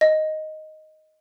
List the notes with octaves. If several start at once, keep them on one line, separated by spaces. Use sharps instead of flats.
D#5